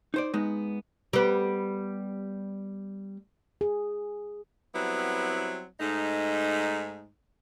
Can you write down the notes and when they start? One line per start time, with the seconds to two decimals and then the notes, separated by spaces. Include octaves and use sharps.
0.14 D#4 C5 D5
0.34 G#3 B3 D#4
1.13 G3 B3
3.61 G#4
4.74 F#3 G3 B3 C4 E4
5.80 G#2 A3 D#4